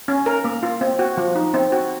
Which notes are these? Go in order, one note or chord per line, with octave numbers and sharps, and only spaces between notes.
C#4
A#4
A#3
F4
C4
F#4
F3
D#4
C4
F#4